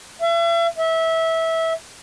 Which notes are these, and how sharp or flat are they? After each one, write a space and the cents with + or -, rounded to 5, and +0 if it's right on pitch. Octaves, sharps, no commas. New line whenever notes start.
E5 +40
E5 -20